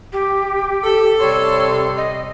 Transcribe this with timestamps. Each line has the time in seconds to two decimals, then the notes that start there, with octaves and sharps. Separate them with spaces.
0.12 G4
0.83 A4
1.20 C3 G3 C#5 C6
1.97 D#5